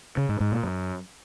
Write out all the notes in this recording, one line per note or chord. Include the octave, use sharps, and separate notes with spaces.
C#3
G#2
G#2
A#2
F#2